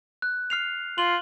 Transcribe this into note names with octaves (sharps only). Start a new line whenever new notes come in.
F#6
F6 C7 F7
F4 F#7 G7